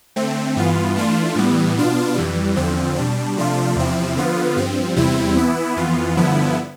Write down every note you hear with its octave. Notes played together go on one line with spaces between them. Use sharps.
D3 A3 C4
G2 E3 B3 F4
E3 A3 D4 F4
A2 E3 G3 B3
B2 B3 D4 F4
F2 E3 G3
E2 D3 F3 C4
B2 G3 D4
C3 F3 A3 D4 F4
E2 C3 F3 C4 E4
D3 F3 B3 F4
G2 F3 C4
E2 C3 G3 C4 E4
E3 B3 E4
F2 E3 B3 F4
G2 D3 F3 B3 E4